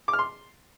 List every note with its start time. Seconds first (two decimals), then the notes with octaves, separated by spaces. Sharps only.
0.08 D6
0.13 F6
0.19 C6